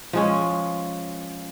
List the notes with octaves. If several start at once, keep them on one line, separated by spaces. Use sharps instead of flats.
F3 G#3 C#4